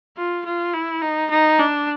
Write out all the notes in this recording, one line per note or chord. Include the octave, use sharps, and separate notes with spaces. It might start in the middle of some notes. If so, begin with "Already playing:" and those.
F4
F4
E4
D#4
D#4
D4